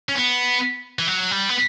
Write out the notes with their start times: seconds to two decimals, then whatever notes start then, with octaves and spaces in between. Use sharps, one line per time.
0.09 C#4
0.15 B3
0.99 E3
1.08 F#3
1.31 G3
1.49 B3